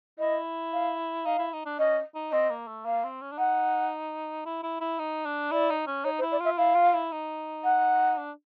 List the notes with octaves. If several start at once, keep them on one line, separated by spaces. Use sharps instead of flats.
E4 D#5
F5
D#4 F5
E4
D#4
D4
C#4 D#5
D#4
C4 D#5
A#3
A3
A#3 F5
C4
C#4
D4
D#4 F#5
E4
E4
E4
D#4
D4
E4 D5
D#4
C#4
D#4 C#5
C5
E4
D5
F4 E5
E4 F5
F4
E4
D#4
F#5
D4